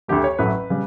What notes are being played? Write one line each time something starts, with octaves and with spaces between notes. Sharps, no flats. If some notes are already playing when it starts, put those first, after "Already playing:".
D2 D3 A3 G4
C#5
A1 A2 F#3 A3 B4
C#3 G3